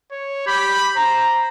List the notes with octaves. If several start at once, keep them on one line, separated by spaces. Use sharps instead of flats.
C#5
G4 B5
C5 A#5